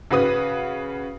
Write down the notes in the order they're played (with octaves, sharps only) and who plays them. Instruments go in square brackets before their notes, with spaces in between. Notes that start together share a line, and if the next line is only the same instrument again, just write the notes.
[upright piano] C#3 F#4 B4 D#6